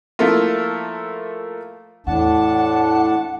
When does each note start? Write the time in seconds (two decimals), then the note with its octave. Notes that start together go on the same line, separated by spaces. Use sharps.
0.19 F3 A3 A#3 E4 F4
2.07 E2 A2 D4 F#5 A5